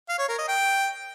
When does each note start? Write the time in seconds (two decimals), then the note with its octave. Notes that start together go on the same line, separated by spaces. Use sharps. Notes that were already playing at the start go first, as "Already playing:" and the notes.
0.09 F5
0.19 C#5
0.29 A#4
0.38 D#5
0.48 G5